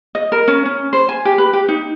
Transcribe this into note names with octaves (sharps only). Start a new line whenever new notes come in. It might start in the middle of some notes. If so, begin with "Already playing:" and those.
D#5
A#4
C#4
C#4
C5
G#5
G4
B4
G4
D#4